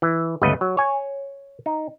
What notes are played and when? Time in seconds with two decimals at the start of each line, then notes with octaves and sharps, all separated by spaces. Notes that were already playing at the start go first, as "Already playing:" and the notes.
0.02 E3
0.42 G1 C#2 A3 B4 D#5 F#5
0.61 F#3
0.77 C#5 G#5
1.66 D#4